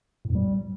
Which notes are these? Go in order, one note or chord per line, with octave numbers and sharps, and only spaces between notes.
A2
F#2
G3